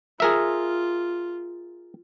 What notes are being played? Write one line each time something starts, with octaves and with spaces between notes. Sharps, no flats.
F4 G#4 A#4 E5